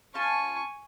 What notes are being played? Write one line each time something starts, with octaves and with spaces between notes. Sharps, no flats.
C#4 F4 G#5 A5 C#6